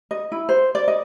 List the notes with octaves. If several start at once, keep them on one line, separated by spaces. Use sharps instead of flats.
D#5
E4
C5
D5
D#5